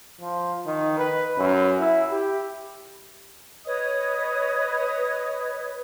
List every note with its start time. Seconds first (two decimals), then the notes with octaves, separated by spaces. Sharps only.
0.21 F3
0.67 D#3
0.98 B4
1.38 F#2
1.80 E4
2.11 G4
3.65 B4 C#5 D#5 D#6